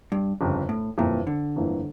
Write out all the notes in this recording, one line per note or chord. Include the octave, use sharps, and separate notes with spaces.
G2
G1 F2 C#3
A2
G1 F2 A#2 E3 A#3 E4
D3
G1 F2 E3 A#3 E4